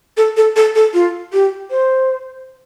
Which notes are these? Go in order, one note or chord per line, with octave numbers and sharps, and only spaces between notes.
A4
A4
A4
A4
F4
G4
C5